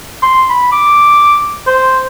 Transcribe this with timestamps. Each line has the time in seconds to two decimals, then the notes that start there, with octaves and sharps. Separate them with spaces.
0.23 C6
0.50 B5
0.72 D6
1.67 C5